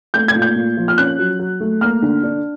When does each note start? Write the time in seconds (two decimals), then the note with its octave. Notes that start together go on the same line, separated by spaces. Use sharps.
0.14 A3 G6
0.28 G#6
0.35 A#2
0.42 G6
0.56 A#2
0.77 F3
0.88 F6
0.98 C#4 F#6
1.19 F#3
1.39 F#3
1.60 A3
1.81 A#3 F6
2.02 D3
2.23 D4